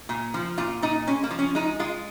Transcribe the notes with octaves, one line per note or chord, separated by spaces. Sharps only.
A#2
F3
A#2 F4
A#2 D#4
G#3 C#4
A#3
F3
C#4
G#3 D#4
G#3 F4